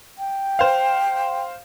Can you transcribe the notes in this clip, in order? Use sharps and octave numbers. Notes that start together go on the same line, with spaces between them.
G5
C5 F5